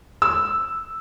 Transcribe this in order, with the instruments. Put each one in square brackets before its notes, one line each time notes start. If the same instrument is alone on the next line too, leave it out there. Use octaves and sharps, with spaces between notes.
[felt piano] E6